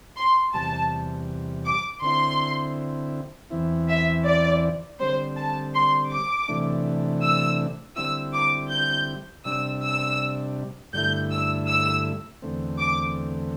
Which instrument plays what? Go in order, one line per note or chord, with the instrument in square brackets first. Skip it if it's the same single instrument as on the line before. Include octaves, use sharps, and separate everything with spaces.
[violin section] C6
[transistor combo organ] E2 C3 G3 [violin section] A5
[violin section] D6
[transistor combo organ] D3 C4 E4 [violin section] C6
[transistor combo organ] E2 E3 C4 E4
[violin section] E5
D5
[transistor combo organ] D3 G3 C4 [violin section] C5
[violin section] A5
C6
D6
[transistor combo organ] C3 E3 A3 D4
[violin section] E6
[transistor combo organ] D3 G3 C4 E4 [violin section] E6
[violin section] D6
G6
[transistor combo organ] C3 G3 D4 [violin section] E6
[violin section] E6
[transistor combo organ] G2 D3 A3 E4 [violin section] G6
[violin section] E6
E6
[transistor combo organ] E2 D3 A3 C4
[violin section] D6